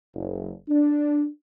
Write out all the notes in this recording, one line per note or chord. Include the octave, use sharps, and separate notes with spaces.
F#1
D4